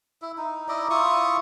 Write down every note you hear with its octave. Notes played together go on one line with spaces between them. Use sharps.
E4
D#4
D#4 E4 D5 D#5
E4 F4 C#6 D#6